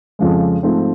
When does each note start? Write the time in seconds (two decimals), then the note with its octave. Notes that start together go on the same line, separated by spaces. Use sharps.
0.19 F2 C#3 F3 G#3
0.63 G#2 F3 A3 C4